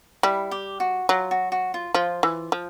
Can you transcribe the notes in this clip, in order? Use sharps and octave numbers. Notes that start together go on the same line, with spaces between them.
G3 E4
G4
F#4
F#3 F4
F#4
F#4
F4
F3 F4
E3
F3